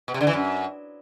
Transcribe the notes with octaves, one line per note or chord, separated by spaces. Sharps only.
B2
C3
D3
E3
F#2